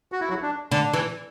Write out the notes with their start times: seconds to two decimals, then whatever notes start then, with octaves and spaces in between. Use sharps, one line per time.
0.12 F#4
0.21 E4
0.29 F#3 F#4
0.42 D4
0.72 D3 D4
0.93 E3